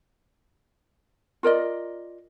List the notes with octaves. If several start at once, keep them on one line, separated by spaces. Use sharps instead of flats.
F4 A#4 D5 D#5